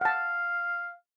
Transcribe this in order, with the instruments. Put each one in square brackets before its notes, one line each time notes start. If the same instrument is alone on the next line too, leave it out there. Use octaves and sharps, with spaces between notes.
[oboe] F5 [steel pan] F#5 A5